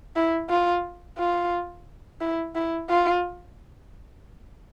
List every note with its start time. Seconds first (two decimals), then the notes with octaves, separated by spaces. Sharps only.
0.16 E4
0.50 F4
1.18 F4
2.21 E4
2.55 E4
2.89 F4